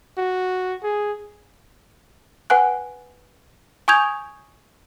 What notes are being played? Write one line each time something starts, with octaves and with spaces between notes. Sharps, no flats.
F#4
G#4
B4 F#5 G#5 F#6
G#5 C#6 D#6 G6 G#6 F7